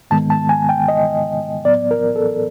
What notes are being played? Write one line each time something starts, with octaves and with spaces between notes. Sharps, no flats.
G#2 D#3 G#3 B3 A5
A5
G#5
G5
D#5
A2 F#3 B3 D5
A#4
A4